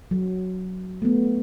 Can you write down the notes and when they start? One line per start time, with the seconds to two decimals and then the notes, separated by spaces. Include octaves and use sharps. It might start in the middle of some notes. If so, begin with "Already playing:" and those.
0.11 F#3
1.02 A3
1.05 B3